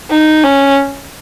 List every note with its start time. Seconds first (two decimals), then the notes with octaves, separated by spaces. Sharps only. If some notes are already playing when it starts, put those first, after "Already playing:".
0.10 D#4
0.43 C#4